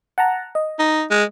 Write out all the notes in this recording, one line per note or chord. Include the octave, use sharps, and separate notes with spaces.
F#5 A5 A#5
D#5
D#4
G#3